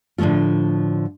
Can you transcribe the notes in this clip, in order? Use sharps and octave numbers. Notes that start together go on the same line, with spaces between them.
A2 D3 F3 A3 F4